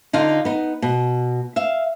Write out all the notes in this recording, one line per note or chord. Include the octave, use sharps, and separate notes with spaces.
D3 D#4 F4 F5
B3 D#4
B2
E5 F5